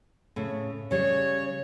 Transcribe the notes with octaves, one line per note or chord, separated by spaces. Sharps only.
A2 C#3
C#3 G3 C#5